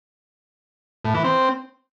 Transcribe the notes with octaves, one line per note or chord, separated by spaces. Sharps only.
A2
E3
C4